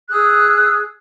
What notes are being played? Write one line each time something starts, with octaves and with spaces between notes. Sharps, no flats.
G#4 D#6 E6 F#6